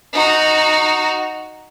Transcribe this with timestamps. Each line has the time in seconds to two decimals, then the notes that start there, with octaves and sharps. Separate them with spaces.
0.13 D#4 F#4